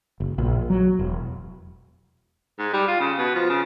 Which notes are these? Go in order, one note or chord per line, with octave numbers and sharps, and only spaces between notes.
F#1
A#1
F#3
E1
G#2
G3
F4
C#3
B2
F3
C#3